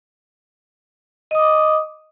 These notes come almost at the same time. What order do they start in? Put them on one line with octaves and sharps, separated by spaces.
D#5 D#6 D6